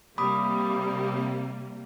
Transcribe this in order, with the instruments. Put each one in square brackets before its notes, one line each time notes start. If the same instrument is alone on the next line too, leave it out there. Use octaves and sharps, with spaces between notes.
[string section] C3 G3 A#3 [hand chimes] B5 D6 D#6